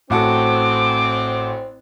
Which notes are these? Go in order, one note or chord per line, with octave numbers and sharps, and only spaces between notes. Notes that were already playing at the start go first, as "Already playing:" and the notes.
A1 C4 F#4 A4 D6